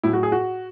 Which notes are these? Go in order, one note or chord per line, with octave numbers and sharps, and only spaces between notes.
A2 F#3 E4
F#4
G#4
F#4